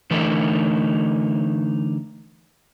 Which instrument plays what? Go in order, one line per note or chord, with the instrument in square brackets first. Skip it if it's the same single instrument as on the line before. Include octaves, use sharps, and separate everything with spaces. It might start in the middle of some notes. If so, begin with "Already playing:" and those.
[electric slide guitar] D3 E3 A3 D#4 A4 A#4